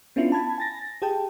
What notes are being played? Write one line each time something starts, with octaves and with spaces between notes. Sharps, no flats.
B3 C#4 D4 E4 F4
A5 B5 G#6
G#5 A6 A#6
G4 G#4 G5 A5